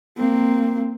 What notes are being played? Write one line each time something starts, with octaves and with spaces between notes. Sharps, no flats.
A#3 C4